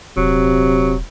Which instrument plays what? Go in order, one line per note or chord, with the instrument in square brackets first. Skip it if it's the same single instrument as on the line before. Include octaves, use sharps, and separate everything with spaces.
[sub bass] D#1 [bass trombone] C3 [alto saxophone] F#3